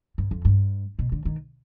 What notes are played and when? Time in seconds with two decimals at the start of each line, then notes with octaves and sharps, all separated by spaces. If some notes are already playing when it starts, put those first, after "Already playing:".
0.18 G2
0.31 F2
0.45 G2
0.99 B2
1.12 D3
1.25 D#3